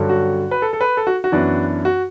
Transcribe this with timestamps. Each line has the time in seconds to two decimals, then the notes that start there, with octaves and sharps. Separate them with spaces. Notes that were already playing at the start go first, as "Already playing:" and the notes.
Already playing: G2 D3 F#3 C#4
0.09 F#4
0.51 B4
0.62 A4
0.73 A4
0.81 B4
0.97 A4
1.07 F#4
1.24 F#4
1.32 F#2 E3 B3 D4
1.85 F#4